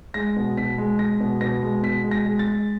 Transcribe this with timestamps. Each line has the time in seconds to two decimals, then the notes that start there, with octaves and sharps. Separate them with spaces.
0.14 G#3 A#6
0.37 B2
0.57 B2 B6
0.78 G#3
0.99 G#3 A#6
1.20 B2
1.41 B2 A#6
1.62 G#3
1.83 B2 B6
2.04 G#3
2.11 A#6
2.26 G#3
2.39 A6
2.47 G#3